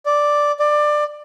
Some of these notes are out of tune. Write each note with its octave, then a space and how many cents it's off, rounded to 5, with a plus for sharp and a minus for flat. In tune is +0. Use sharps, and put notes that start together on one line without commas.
D5 +0
D5 +20